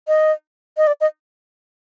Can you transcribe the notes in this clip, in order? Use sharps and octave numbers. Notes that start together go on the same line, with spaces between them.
D#5
D#5
D5
D#5